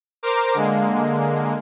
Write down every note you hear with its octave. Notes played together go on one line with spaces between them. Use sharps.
A#4 C5 A#5 D6
D3 G#3 A#3